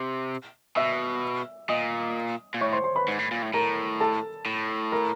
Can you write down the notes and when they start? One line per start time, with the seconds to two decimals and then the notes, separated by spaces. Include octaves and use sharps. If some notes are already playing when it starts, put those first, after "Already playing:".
Already playing: C3
0.76 B2 E5 E6
1.69 A#2 D#5 D#6
2.54 A#2
2.61 A2 C#5 C#6
2.72 C5 C6
2.84 C5 C6
2.96 B4 B5
3.08 G#2
3.19 A2
3.31 A#2
3.42 A2
3.53 A2 A#4 A#5
4.00 A4 A5
4.46 A2
4.92 A#4 A#5